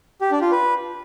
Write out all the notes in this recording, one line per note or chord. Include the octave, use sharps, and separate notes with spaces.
G4
D4
F4
B4